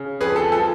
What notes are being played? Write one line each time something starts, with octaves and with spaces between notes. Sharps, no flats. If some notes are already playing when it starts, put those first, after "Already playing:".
Already playing: C#3
F2 G#4 B4
A4
F3 A4